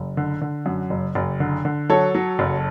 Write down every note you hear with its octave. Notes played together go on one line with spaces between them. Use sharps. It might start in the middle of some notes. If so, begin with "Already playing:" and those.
Already playing: F#1
D3
D3
F#2
F#1
F#1
D3
D3
F#3 A4 C#5
F#3
F#1